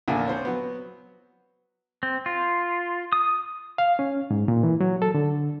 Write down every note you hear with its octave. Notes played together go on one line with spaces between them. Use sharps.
A#1 E2 D3 A#3 E5 G#5
C4 C5 C#5
F#3 B3
C4
F4
D#6
F5
C#4
G#2
A#2
E3
F#3
A4
D3